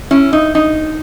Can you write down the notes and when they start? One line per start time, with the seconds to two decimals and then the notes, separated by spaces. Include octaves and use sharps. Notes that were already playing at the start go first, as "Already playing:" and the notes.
0.11 C#4 E4
0.33 D#4
0.55 D#4